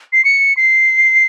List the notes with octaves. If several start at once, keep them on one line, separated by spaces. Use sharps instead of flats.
C7
C#7
C7